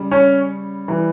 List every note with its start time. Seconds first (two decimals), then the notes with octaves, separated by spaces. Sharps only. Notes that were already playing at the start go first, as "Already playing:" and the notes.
Already playing: C#3 G3
0.11 C#4 C#5
0.88 E3 G3